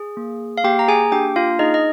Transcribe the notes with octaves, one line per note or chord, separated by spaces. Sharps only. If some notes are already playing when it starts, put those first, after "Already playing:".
Already playing: G#4
A#3
F5
A#3 G4 G5
A#5
G#4 G#5
D4 G4 G5
F4 F5
D#4 G#4 D#5
D#5